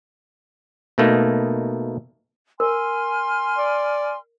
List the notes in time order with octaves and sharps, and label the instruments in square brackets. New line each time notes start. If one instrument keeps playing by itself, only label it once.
[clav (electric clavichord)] B2 A3 A#3 D#4
[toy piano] A#4 [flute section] G#5 C6 F6
[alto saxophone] D5